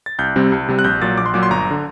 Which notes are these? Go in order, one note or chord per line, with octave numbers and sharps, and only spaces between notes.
A6
C2 G6
C3 G3 C4
C2
C3 G3 C4
F#6
A#1 G6
A#2 F#3 A6
A#1 D6
C6
A#2 F#3 D6
C6
G1 A#5
D3